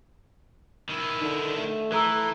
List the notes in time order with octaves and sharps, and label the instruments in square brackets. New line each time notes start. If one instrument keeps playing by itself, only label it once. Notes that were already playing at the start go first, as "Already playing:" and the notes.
[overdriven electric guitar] D#3 E4
[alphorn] D3 [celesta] D#4
[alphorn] A3
[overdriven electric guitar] E3 [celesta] A4 A#5 E6